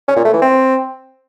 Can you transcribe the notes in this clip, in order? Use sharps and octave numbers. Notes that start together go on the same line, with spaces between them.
C#4
A#2
A3
E3
C4